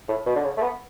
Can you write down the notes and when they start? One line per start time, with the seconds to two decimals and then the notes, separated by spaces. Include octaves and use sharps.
0.09 A2
0.26 B2
0.35 D3
0.44 C#3
0.57 A3
0.62 B3